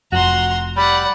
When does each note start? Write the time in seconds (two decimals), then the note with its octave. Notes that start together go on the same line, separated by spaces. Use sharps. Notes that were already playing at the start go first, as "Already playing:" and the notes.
0.12 F1 F2 F#4 A#5 C6
0.77 G3 D5 F#5 B5